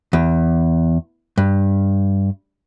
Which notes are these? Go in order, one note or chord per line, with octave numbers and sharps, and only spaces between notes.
E2
G2